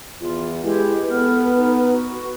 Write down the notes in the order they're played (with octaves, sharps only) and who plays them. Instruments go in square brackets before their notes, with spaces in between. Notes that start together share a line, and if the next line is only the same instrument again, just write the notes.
[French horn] E2 [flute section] F4
[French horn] G#3 [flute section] E4 G4 B4
[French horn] B3 [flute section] A4 B4 F6
[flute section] D#4 B4
F#4